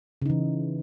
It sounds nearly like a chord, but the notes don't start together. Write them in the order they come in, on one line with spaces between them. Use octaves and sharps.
C#3 D#4 E3